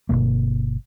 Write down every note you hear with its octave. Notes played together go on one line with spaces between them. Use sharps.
G1 G#2 B2 A#3